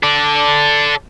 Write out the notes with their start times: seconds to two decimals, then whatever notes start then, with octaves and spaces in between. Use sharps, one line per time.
0.03 A4 D5